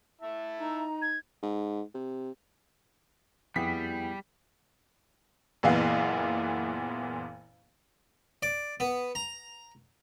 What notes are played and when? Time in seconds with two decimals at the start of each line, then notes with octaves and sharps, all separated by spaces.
0.21 E4 E5 A5
0.60 D#4 A#5
1.02 G#6
1.43 G#2
1.94 C3
3.56 F2 G3 B3 E4 G#4 F#5 G5 B6
5.63 F#1 A#2 E3 B3 F5
8.43 D5
8.80 B3
9.15 A#5